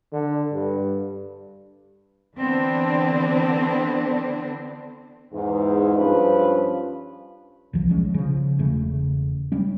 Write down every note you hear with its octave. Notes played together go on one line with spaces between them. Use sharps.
D3
G2
D3 E3 B3 C4 D4
E2 G#2
G2 F3 C#4 B4
D1 B1 F3
F3 G3 G#3 C#4
C#3 F3
E1 C#3 A3
G3 C#4